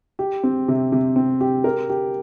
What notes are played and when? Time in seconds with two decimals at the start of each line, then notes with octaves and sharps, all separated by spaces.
0.19 G4
0.43 C4
0.68 C3
0.92 C3
1.16 C4
1.41 G4
1.64 A#4
1.89 G4